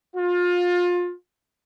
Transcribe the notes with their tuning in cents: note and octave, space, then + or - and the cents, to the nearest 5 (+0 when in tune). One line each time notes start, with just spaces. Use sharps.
F4 +25